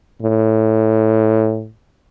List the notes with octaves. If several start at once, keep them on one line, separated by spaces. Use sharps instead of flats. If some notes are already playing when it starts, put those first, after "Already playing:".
A2